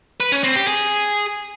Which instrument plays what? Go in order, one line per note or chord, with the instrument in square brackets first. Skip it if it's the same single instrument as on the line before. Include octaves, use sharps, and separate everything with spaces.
[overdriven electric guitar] B4
C#4
C4
G4
G#4